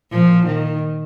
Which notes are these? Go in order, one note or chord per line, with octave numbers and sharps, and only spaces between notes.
A#2 F3
D#3